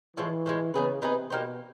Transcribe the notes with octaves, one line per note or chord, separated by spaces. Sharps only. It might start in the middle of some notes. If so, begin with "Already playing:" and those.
A2 E3 F3 G#3
A2 F3 G#3
C#3 B3 D#4 G#4 B4
C3 B3 D#4 G#4 B4
B2 A#3 D#4 G4 C5